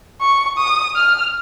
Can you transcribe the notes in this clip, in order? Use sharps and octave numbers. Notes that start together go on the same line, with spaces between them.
C#6
D#6
F6